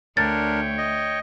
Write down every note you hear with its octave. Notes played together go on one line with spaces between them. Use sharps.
D2 D4 A#4 C#5 G5 A6
D#5